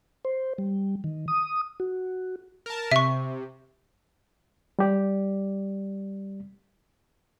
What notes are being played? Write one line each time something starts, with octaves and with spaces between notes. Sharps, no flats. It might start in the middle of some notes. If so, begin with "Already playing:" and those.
C5
G3
D#3
D#6
F#4
A#4 A5
C3 E5 C#6
G3 G4 D5